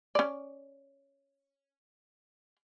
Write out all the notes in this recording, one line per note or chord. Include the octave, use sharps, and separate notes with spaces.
C#4 D5